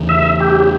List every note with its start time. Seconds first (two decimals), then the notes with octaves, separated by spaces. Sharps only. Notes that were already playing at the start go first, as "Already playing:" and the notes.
Already playing: E2 C#3 E3
0.09 E5
0.40 G4